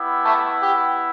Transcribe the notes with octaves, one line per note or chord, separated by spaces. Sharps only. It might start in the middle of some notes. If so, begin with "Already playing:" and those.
Already playing: B3 E4 G4
A3 A4
G4